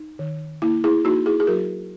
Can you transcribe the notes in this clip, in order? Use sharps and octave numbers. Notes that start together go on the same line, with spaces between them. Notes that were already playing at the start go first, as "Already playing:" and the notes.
Already playing: D#4
D#3
A#3 E4
E4 G#4
A#3 D#4 F#4
E4 G#4
G#4
F#3 F#4 A#4